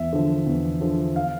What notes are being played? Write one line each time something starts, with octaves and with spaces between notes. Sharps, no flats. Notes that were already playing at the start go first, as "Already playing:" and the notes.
Already playing: E2 E5
D3 F3
E2
D3 F3
F5